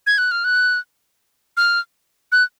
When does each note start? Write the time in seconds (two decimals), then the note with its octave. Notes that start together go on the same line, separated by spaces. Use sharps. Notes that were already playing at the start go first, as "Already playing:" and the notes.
0.07 G#6
0.18 F#6
0.31 F6
0.44 F#6
1.57 F6
2.32 F#6